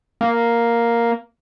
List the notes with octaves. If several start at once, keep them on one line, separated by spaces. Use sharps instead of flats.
A#3